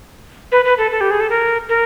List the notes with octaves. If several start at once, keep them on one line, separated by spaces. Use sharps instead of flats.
B4
B4
A4
A4
G4
G#4
A4
A#4
A#4